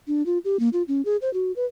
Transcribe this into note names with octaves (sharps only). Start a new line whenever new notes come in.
D4
F4
G4
A#3
F4
C#4
G#4
C5
F#4
B4